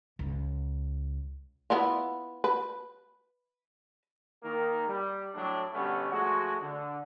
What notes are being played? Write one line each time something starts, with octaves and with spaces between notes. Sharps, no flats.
C#2
B3 E4 F4
B4
D#3 A#3 A#4
G3
A2 F#3 D4
B2 D3 G3 A3 B3 C#4
F3 G#3 A3 F#4
D3